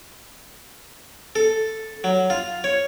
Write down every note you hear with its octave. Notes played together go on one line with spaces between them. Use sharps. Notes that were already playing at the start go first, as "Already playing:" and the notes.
A4
F#3
F4
C#5